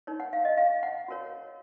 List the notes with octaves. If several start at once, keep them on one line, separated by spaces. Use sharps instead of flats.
D#4 A#4 C#5
F#5
F5
D#5
F5
F#5
F#4 A#4 C#5